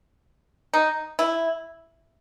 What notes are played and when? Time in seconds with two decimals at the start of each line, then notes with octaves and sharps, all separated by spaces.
0.74 D#4
1.19 E4